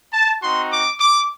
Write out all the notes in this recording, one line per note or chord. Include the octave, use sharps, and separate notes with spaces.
A5
C4 D#4 F#4 C6
D6
D6